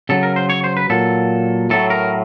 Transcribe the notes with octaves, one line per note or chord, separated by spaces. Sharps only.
C#3 F#3 A4
A#4
C5
C#5
C5
B4
A#2 F#3 A4
A2 F#3 A4
A#4